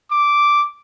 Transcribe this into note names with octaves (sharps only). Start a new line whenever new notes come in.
D6